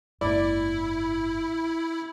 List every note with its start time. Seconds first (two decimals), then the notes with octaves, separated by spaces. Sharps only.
0.21 F#1 G#2 E4 D5